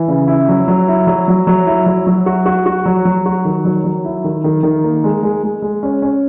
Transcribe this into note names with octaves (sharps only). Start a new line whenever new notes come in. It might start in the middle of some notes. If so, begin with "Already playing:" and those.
Already playing: E3
C#3
E4
F#3
F#3
E4
F#3
F#3
F#3
E4
F#3
F#3
F#4
F#4
F#4
F#3
F#3
F#4
D#3
F#3
F#3
E4
D#3
D#3
D#3
A#3
G#3
G#3
G#3
G#3
C#4
C#4